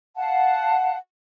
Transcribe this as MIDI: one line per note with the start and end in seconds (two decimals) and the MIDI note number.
0.17 0.96 77
0.17 0.96 78
0.17 0.96 81